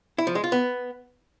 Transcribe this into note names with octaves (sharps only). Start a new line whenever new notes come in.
E4
F3
G#3
F4
B3